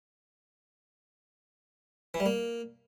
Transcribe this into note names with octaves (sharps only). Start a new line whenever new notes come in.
E3
G3
A#3